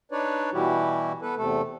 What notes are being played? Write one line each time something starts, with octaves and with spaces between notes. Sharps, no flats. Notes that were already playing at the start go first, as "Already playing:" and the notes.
D4 D#4 B4 C#5 D5
B2 E3 G3 E4 F#4 G4
B3 A4 B4
E2 C3 A3 A4